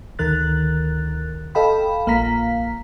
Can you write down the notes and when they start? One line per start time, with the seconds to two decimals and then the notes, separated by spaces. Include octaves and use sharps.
0.19 D2 D#3 A#4 F#6 A6
1.55 A4 D#5 F5 G5 B5
2.06 A#1 A#3 F5 A#5 B6